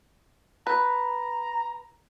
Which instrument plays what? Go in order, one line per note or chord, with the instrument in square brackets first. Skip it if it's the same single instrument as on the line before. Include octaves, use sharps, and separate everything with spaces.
[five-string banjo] B4 [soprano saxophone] A#5